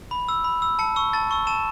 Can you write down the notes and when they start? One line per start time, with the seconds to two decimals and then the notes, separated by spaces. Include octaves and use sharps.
0.11 B5
0.29 E6
0.44 B5
0.62 E6
0.79 A5 C#7
0.96 C#6 E6
1.13 A5 A6
1.31 C#6 E6
1.47 A5 E7